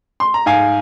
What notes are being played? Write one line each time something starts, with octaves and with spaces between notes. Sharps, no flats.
C6
A#5
G#2 F5 G#5